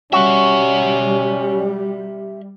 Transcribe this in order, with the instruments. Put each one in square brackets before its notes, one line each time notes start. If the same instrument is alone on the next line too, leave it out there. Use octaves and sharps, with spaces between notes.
[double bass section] G3 [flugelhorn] C#4 [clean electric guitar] F#4 [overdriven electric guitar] G4 E5